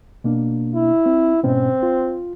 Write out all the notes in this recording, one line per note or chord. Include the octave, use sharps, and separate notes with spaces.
B2 A#3 D4
E4
C4
G#2 B2 C4 C#4
F4